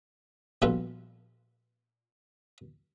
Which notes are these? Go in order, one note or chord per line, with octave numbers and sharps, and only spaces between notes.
A#1 B2 G3 F4 A4 B4